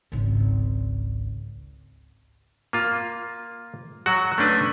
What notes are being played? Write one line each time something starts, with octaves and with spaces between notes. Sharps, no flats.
G#1 C#2
A#3 F4
F#3 F#4
A3 C#4 D4 B4